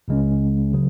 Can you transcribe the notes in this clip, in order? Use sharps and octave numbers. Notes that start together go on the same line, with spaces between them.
C#2 C#3 G#3 C#4
C#3 F#3